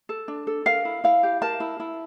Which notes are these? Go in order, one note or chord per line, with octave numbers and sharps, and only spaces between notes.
A4
D4
A4
A#4 F5
E4
E4 F5
G4
A#4 A5
E4
E4